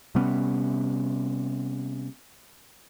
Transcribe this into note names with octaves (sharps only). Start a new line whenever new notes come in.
C3 G3 B3 C#4